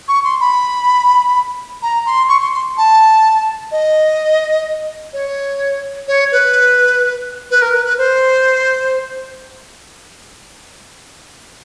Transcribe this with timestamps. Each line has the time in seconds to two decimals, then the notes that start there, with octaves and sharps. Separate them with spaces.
0.08 C#6
0.24 C6
0.40 B5
1.83 A#5
2.06 C6
2.29 C#6
2.41 C6
2.53 C6
2.77 A5
3.72 D#5
5.13 C#5
6.08 C#5
6.32 B4
7.51 B4
7.62 A#4
7.74 B4
7.85 B4
7.98 C5